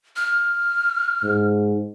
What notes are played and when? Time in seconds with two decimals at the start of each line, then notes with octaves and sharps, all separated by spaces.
0.16 F6
1.23 G#2